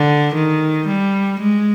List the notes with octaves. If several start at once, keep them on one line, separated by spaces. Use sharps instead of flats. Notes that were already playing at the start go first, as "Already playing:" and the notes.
Already playing: D3
D#3
G3
G#3